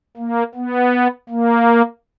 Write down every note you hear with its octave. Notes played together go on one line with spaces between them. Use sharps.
A#3
B3
A#3